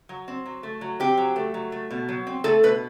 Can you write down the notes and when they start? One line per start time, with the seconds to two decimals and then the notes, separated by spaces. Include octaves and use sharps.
0.09 F#3
0.28 C4
0.46 F#3
0.63 A3
0.81 F#3
1.00 C4 G4
1.17 F#3
1.36 A3
1.54 F#3
1.72 A3
1.91 B2
2.09 F#3
2.27 C4
2.44 A3 A4
2.63 B2 B4